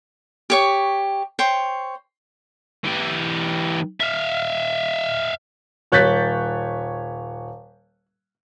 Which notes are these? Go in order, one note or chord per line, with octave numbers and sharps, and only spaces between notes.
G4 C#5 C#6
C5 C#5 G5
E3 G4
E5 F5
D#1 C#5 F#6 G6 A6 B6